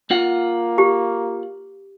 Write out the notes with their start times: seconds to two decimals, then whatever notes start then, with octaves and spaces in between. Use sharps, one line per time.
0.11 A#3 F4 F#5
0.78 G4